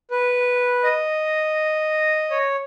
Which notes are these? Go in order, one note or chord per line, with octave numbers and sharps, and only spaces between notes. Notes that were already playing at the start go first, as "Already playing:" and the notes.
B4
D#5
C#5